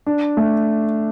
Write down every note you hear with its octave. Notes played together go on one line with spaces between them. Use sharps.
D4
A3